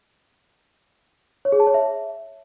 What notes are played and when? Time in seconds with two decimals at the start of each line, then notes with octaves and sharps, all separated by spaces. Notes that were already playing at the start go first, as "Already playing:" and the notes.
1.45 C#5
1.52 G#4
1.60 A5
1.67 C#5
1.74 E5